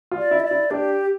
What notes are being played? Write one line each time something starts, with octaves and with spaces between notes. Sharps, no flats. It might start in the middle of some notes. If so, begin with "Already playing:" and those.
F4
D5
E4
E5
D5
E4
D4 G4